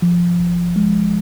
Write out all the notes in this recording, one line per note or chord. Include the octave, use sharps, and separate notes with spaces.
F3
G#1
G#3